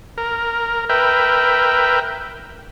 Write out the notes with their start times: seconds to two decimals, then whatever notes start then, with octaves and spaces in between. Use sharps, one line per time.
0.18 A#4
0.89 A#4 B4 E5 G5